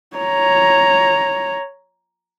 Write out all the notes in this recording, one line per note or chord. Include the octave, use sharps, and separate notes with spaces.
C#5 A#5